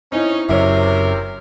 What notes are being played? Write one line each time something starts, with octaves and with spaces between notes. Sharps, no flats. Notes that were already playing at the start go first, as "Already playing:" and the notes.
C4 C#4 D#4 E4
F#1 F#2 C3 A#4 C#5 E5